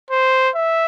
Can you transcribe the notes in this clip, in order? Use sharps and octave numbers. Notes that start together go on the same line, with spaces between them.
C5
E5